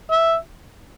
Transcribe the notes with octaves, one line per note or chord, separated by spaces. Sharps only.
E5